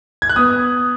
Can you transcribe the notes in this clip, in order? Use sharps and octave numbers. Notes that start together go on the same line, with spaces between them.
G#6
F#6
B3 D#6